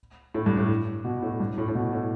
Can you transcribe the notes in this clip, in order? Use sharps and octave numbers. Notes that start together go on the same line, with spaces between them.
A2
G2
A2
B2
A2
G2
A2
A2
B2
A2